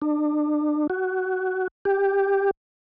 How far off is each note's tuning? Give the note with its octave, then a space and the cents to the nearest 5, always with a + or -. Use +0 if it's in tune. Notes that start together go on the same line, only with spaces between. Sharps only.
D4 +35
F#4 +15
G4 +10